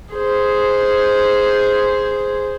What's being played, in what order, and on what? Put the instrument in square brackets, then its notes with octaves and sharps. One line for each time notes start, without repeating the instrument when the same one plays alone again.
[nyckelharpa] G#4 C5